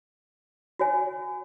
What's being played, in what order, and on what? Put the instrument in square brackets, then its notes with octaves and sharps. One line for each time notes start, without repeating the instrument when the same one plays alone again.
[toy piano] F#4 C#5 G#5